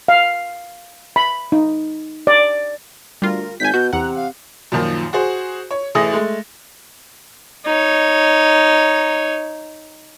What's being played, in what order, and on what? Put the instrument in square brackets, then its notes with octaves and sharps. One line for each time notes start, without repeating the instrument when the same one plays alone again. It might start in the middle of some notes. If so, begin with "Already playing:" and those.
[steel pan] F5
B5
D#4
D5
[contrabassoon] D2 [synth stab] G3 F4 [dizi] A#4
[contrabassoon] G#1 [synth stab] G#5 B6 [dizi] G6
[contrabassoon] B2 [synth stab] F#4
[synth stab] E2 F#5 [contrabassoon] C3 [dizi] A#5
[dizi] F5
[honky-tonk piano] F#2 A#2 D#3 F3
F#4 G#4 C5
C#5
A1 E3 A3 G#4 D#6 A#6
G#3 A3
[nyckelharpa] D#4 C#5